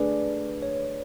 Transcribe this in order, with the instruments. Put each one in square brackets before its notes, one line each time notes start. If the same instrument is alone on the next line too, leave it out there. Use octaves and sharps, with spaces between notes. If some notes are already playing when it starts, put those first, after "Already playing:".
Already playing: [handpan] A3 D4 G#4 D5 [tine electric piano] B4
[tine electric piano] C#5